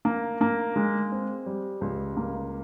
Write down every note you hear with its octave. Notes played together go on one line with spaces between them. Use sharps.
A#3
A#3
G#3
C4
G3
C#2
A#3